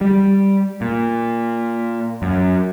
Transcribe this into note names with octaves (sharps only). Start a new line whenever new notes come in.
G3
A#2
F#2